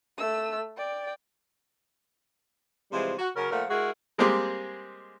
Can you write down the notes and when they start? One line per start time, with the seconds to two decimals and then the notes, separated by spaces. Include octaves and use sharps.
0.18 A3 E6
0.77 D5 G5
2.92 C3 E3 F3 G3 G#3
3.19 F#4
3.35 C#3 F#3 C#4 A#4
3.51 A#2 F3 A3 A#4 F#5
3.70 G#3 E4 F#4 G#4 A#4
4.18 G3 G#3 A#3 C4 G4 G#4